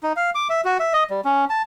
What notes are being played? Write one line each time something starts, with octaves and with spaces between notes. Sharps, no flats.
D#4
F5
D6
E5
F#4
E5
D#5
G3
C#4
A5